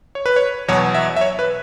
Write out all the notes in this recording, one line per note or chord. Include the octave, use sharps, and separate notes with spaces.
C#5
B4
C#5
E2 B2 F#3 C#5
E5
E5
C#5
B4